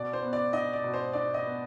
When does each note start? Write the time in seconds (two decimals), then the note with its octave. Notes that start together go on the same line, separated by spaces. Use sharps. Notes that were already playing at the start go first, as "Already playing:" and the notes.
Already playing: B2 D5
0.13 C5
0.23 B3
0.33 D5
0.53 D4 D#5
0.73 D5
0.84 B2
0.94 C5
1.13 D4 D5
1.34 D#5
1.44 B3